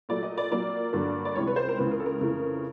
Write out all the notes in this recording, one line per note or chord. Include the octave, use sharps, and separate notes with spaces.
A#2 F#3 A3 D5
D#5
D5
A#2 F#3 A#3 D5
G2 D3 F#3 A#3
D5
C#2 C3 E3 G3 C#5
B4
C5
A#4
C#2 C#3 E3 B4
A#4
A4
A#4
F2 C#3 E3 A3